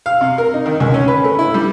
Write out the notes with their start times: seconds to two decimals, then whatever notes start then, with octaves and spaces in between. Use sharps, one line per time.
0.06 F5
0.21 C3
0.38 A#4
0.54 D#4
0.66 D#3
0.80 C#2
0.94 C#4
1.08 B4
1.24 A3
1.39 E4
1.54 G3